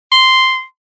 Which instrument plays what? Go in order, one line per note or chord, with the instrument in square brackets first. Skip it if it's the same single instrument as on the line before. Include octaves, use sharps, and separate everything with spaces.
[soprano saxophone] C6